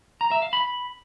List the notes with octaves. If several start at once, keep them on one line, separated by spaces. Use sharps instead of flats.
A#5
E5
F5
B5